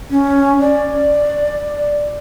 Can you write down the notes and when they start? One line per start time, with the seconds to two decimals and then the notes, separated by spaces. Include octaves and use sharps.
0.11 C#4
0.60 D5